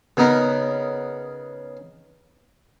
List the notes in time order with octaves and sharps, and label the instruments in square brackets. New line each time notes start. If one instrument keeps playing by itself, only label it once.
[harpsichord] C#3 B3 D#4 A#4